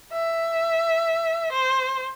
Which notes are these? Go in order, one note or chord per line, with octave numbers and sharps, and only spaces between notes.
E5
C5